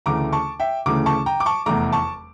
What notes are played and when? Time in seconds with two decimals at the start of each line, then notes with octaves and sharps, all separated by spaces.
0.06 D2 C#3 E3 A3 A#5 D6
0.33 A5 C#6
0.60 E5 G5
0.86 D2 C#3 E3 A3 A#5 D6
1.06 A5 C#6
1.26 G5 A#5
1.40 D6
1.46 A5 C#6
1.66 F1 E2 E3 A3 A#5 D6
1.93 A5 C#6